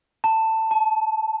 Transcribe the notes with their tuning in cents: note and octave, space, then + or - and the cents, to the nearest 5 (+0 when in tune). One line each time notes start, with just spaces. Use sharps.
A5 +15
A5 -20